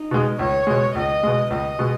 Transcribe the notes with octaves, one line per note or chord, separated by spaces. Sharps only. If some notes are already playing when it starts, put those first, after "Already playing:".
Already playing: D#4
B2 G#3
C#2 C#5
B2 G#3
C#2 D#5
B2 G#3
C#2 D#5
B2 G#3